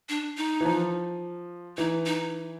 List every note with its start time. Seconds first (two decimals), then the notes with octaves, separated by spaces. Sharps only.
0.09 D4
0.37 D#4
0.61 E3
0.65 F3
1.77 E3 D#4
2.06 D#4